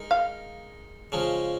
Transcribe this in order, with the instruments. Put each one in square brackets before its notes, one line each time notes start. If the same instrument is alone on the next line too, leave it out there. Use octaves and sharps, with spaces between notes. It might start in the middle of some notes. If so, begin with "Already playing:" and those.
Already playing: [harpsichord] G#3 D#4 A#4
[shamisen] F5
[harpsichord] C#3 F3 G#3